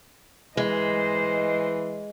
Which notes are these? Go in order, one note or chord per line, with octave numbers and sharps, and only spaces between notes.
E3 G#3 C5 D#5